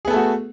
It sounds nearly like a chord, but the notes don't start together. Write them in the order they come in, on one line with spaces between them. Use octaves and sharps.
G#4 B3 A4 A3 F#4